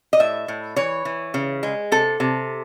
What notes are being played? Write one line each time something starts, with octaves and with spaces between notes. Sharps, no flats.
D#5
A2 E5
A2
E3 C#5
E3
C#3
G#3
C3 A4
C3